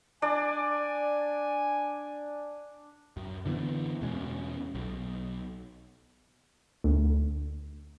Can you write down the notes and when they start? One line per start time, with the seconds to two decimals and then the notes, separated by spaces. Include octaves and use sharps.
0.22 D4 D5 G#5
3.17 F#2
3.45 D3 E3 B3
4.01 E2 B2 G#3 C#4
4.75 B1
6.84 D2